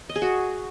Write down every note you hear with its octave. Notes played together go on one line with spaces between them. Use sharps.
D#5
G#4
F#4